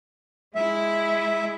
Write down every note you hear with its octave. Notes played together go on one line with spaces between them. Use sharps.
G#3 E4 E5